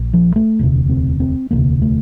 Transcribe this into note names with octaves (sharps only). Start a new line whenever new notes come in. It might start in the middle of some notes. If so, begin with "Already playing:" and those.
Already playing: A#1 A#2
F3
A3
E1 D2 C3
C4
C4
E1 D2 C3 A#3
A3